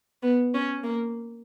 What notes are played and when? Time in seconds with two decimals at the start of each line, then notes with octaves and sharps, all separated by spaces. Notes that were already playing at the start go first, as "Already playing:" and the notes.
0.22 B3
0.54 C#4
0.83 A#3